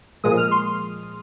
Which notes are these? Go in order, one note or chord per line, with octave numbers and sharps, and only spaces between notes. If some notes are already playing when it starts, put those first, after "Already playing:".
A#2 F3 G#3 D#6
F6
C6